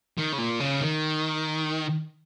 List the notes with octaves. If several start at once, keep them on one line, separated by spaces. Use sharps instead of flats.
D#3
C#3
A#2
C#3
D#3